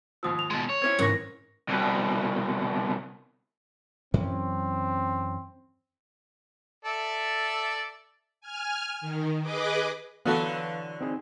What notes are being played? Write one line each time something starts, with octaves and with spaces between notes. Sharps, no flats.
D#2 G#2 F3 D#6 E6
F7
B2 G#3
C#5
C4 C#4 E4 G#6
D#2 G#2 C#3 E3 A#4 C#6 A#6
C2 B2
F#2 E3 C4 C#4
A4 D5 E5
G#5 F6
D#3
G#4 B4 D#5 D6
D3 E3 F#3 B3 F#4 A4 B4 F5
C4 D#4 G#4